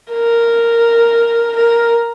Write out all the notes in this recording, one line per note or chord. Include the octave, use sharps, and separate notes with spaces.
A#4
A#4